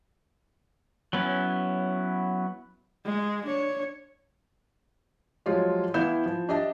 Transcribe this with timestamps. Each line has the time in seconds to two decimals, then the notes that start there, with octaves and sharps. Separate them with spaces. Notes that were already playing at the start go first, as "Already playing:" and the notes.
1.13 F#3 B3 C#4 E4
3.05 G#3
3.46 D4 C#5
5.46 F3 F#3 G#3 F4 G4 C#5
5.94 E3 B3 E4 F5 G6 E7
6.26 F3
6.49 D4 G4 D#5 E5 A5